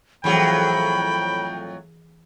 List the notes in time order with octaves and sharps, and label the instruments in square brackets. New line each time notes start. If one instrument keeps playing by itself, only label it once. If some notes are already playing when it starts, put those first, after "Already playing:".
[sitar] F2 A2 F#3 [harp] E3 G#4 C#7 [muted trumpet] G5 [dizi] B5